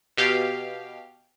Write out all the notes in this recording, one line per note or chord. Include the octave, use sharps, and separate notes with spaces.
B2 G4 F5